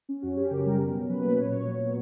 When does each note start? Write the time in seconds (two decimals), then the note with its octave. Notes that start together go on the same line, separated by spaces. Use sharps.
0.09 C#4
0.22 F#2 F#4
0.37 C#4 G4
0.51 C#3 A#4
0.66 G3
0.80 B2
0.94 C#4
1.09 F#3 B4
1.23 A#3
1.37 A#2 C#5
1.52 A#2
1.67 F#3
1.80 B3